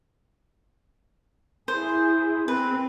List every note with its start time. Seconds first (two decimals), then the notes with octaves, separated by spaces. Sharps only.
1.68 E4 G#4 C5
2.48 C4 B4